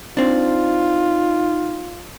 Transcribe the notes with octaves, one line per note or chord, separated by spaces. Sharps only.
C4 D4 D#4 F4